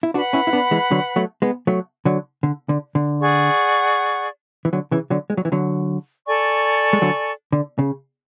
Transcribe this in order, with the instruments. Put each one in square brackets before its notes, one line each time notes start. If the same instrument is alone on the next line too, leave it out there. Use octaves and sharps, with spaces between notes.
[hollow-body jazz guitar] E4
[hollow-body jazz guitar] D4 F#4 [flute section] B4 F#5 B5
[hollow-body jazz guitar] C#4 E4
E4
B3 D4
E3 G#3
D3 F#3
F#3 A3
G#3 B3
F#3 A3
D3 F#3
D3
D3
D3
[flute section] G#4 D5 F#5 C#6
[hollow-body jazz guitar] E3
D3 F#3
C#3 E3
D3 F#3
G#3
F#3
E3
D3 F#3
[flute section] A4 D5 G#5 C#6
[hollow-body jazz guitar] G#3
D3 F#3
D3
C#3